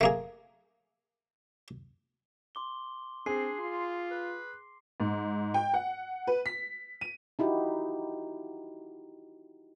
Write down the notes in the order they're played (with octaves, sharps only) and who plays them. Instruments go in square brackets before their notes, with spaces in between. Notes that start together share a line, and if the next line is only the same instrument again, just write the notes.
[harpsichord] A3 A#3 G#4
[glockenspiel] C6 D6 G7
[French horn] C4 [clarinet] D4 [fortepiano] G#4 [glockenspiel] C7
[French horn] F4 [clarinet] C6
[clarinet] B4
[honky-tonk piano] G#2
G5
F#5
B4
B6
D#7
[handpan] D#4 E4 F#4 G4